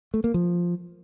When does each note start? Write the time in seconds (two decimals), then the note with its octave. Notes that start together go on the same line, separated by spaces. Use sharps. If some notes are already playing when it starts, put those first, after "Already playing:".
0.14 A3
0.24 A#3
0.34 F3